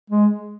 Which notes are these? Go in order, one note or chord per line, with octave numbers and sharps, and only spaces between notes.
G#3